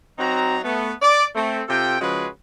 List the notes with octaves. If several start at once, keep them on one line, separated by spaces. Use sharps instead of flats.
F#3 C4 D#4 F#4 A#5
A3 B3
D5
A3 C4
C3 F4 A4 G5
C#3 F3 G#3 F#4 G#4 B4